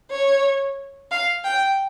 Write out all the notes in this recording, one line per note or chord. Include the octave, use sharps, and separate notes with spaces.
C#5
F5
G5